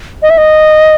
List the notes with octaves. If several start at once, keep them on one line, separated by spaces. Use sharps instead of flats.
D#5
E5
D#5